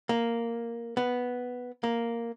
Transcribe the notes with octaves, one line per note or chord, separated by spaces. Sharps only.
A#3
B3
A#3